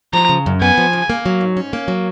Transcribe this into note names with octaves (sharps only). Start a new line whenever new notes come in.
F3 A#5
C#3
F#2
B3 G#5
F3
C#3
A#3
F#3
G#2
C#4
A#3
F#3